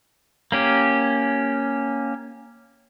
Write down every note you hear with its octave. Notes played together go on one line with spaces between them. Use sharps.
A#3 C#4 G4